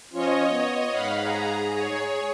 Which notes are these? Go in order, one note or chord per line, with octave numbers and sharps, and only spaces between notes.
F3 C#4 F4 C#5 D#5
B3
G#2 F5 F#5 B5
G#4 A#5
G#4 C#5